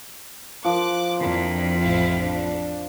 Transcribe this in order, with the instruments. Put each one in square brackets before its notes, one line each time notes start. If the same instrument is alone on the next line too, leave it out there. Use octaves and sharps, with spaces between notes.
[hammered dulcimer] F3 [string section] D6 F#6
[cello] F2 [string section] E3 A#3 D4
[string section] A1 E4 F5
D4